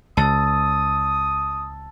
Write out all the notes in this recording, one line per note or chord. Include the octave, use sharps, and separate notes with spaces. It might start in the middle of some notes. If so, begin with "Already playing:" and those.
C#2 A5 D#6 E6 A6